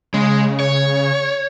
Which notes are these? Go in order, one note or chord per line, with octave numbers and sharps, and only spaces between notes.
C#3 G#3
C#5